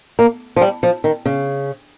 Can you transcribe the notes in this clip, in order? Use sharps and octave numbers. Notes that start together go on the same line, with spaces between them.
A#3
F3
G3
F3
D#3
C#3